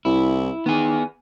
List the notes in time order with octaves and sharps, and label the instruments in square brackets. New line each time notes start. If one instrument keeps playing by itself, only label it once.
[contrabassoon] C2 [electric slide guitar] E4
[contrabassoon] D#3 [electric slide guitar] B3 G#4